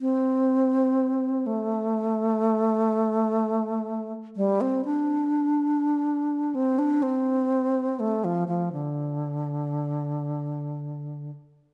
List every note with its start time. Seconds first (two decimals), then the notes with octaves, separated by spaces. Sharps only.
0.01 C4
1.46 A3
4.36 G3
4.61 C4
4.85 D4
6.55 C4
6.79 D4
7.03 C4
8.00 A3
8.24 F3
8.48 F3
8.72 D3